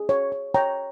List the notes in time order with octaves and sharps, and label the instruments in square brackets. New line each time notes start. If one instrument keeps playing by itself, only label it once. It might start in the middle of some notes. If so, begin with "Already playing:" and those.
Already playing: [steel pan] G#4
C#5
C#5
C#5 G5 A#5